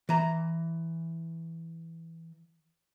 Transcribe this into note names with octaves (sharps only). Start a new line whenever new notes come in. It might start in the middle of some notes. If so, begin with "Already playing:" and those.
E3 A#5